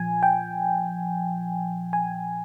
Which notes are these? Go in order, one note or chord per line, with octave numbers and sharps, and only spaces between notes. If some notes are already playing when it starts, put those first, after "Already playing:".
Already playing: A#2 F3 G#5
G5
G#5